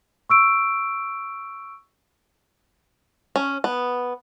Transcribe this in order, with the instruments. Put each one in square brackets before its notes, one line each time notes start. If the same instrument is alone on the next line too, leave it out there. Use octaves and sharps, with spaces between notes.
[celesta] C#6 E6 D7
[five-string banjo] C#4
B3